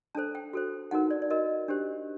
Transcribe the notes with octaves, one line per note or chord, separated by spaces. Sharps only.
D4 A4 C5 A5
G5
F#4 A4 C5
D#4 F#4 A#4 F#5
D5
D5
F#4 A#4 D#5
D4 G4 C5